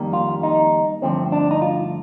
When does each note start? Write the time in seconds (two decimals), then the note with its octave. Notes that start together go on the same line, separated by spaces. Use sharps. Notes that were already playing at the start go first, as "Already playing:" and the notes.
Already playing: F2 D#3 G3 A#3
0.13 F4
0.43 D#4
1.02 G2 D3 F3 A3 C4
1.32 D4
1.51 D#4
1.62 F4